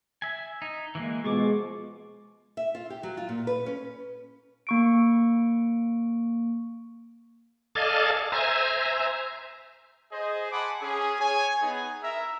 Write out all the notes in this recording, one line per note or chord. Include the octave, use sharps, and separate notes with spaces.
E5 G#5
D#4
E3 G#3 A#3
B2 F3 G#3 F4 C#6 D6
E5
F4
G4
F#3
F4
A#2
B4
C#4
A#3 C#6 D7
A4 D5 D#5 F5 G#5 A5
C5 E5 G#5 A#5
G#4 C5 D#5
F#5 G#5 A5 B5 C6 D6
C#4 G#4
C#5 G#5
B3 D#4 G#4
E4 A#4 E5